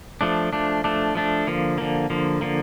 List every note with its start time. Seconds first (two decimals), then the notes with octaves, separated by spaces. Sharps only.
0.21 F3 A3 D4
0.53 F3 A3 D4
0.84 F3 A3 D4
1.15 F3 A3 D4
1.47 D3 F3 A#3
1.78 D3 F3 A#3
2.10 D3 F3 A#3
2.41 D3 F3 A#3